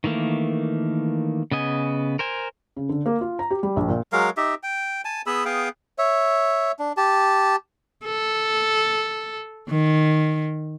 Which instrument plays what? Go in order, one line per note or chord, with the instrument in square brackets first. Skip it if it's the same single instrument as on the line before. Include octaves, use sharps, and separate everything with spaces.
[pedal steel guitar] D#3 E3 A3 A#3
C#3 B3 D#5 G#5
A#4 C5 G#5
[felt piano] C#3
D3
A#3
F4
A#5
G4
G3
A#1
A#2
[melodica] F#3 G#3 A#4 F5
D#4 G4 E5
G5
G#5 A5
B3 G#4 B5 E6
B3 G#4 F5 G5
C#5 E5
D4
G4 A5
[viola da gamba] A4
D#3